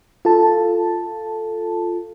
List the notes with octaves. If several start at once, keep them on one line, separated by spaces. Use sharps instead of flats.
F4 A4 A5